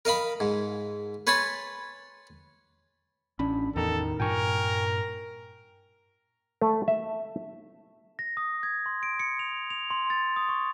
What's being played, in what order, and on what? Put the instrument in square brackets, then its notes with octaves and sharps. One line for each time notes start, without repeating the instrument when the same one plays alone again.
[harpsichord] A#4 D#5 F5 B5
G#2
B4 C#5 G#5 A5 B5 C6
[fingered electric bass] A1 C#4 [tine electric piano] D4 B5
[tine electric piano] A1 D#3 A#5 [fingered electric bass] E2 [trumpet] A4
[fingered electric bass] G2 A#2 [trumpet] A#4 [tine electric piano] G5 G#5 C#6
[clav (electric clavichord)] A3
E5
[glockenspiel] A#6
D#6
G#6
C6
D7
C#7
F7
F7
C6
A6
D#6
C#6